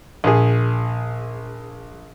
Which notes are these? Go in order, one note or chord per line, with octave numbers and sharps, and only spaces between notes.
A#1 G#4